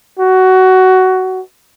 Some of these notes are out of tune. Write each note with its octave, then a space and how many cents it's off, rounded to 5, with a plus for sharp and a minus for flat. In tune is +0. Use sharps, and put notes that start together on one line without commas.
F#4 +15